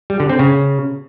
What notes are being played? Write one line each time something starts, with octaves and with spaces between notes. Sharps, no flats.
G3
D3
C4
C#3